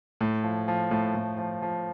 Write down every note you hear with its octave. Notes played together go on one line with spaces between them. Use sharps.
A2
F3
F3
A2
A2
F3
F3